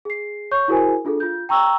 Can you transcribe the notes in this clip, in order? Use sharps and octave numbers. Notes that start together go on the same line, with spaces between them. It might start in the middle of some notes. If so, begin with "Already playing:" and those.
G#4 C7
C#5 C#6 G6
E4 F#4 G#4 A#4 C5 G#5
D4 F4 G#4 A4
F4 G6
G5 A#5 C#6 E6